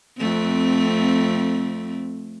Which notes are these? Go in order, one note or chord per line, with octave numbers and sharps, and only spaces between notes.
F2 A3 C4